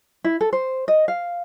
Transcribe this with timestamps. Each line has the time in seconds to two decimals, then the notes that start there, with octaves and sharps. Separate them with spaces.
0.24 E4
0.41 A4
0.53 C5
0.88 D#5
1.08 F5